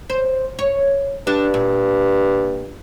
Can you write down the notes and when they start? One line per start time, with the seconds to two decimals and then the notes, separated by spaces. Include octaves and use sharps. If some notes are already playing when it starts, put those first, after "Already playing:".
0.10 C5
0.59 C#5
1.27 G2 D4
1.54 A#2